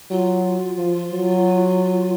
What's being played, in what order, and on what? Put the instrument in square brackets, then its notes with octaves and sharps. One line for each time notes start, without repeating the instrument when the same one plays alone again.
[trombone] F#3 [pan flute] F4
[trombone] F3
F#3